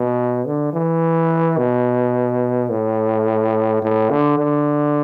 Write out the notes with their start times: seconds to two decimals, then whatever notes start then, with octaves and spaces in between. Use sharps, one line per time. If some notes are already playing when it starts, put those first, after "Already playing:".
Already playing: B2
0.46 D3
0.74 E3
1.58 B2
2.70 A2
3.83 A2
4.11 D3
4.38 D3